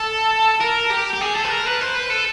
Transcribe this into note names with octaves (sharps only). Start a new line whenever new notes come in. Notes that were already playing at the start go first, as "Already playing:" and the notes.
Already playing: A4
A#4
G4
G4
G#4
A4
B4
A#4
B4
C5
B4
A4